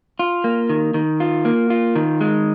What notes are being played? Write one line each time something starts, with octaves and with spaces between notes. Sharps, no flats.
F4
A#3
D#3
D#3
F4
A#3
F4
D#3
G#3